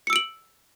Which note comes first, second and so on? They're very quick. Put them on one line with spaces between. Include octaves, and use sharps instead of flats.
C#7 E6 D7 F#7